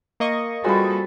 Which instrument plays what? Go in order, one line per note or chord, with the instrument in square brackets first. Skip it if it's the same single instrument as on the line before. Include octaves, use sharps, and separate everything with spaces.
[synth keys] A#3 D#5 C#6
[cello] G3 A4 [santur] C4 B4 [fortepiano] F4 F#4 G#4